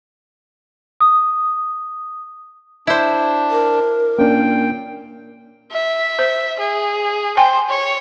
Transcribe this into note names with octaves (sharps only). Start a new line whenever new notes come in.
D#6
D4 E4 C5
A#4
A#2 A#3 C#4 D4 G5
E5
C5
G#4
C5 G5 G#5
C#5